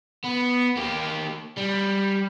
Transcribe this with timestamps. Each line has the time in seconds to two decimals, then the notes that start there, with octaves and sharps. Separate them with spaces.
0.24 B3
0.77 A#3 G4
1.57 G3